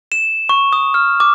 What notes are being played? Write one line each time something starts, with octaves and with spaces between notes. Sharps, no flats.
E7
C#6
D#6
F6
D6